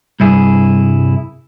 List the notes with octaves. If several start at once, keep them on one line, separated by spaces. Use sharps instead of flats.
C2 G2 E4 G#4